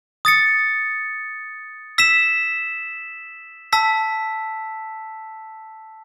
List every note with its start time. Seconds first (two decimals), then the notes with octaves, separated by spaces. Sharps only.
0.25 D#6 A6 C#7
1.98 E6 B6 E7
3.73 A5 E6 B6